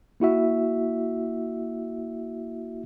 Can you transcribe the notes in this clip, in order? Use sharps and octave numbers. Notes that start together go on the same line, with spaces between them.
A#3 E4 F#4 E5